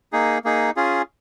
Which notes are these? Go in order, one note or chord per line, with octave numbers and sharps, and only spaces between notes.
A#3 D#4 G#4
A#3 D#4 G#4
C#4 F4 G#4